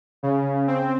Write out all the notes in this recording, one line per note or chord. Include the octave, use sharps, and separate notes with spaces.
C#3
C4